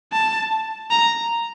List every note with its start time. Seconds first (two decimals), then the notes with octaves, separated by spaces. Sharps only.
0.12 A5
0.91 A#5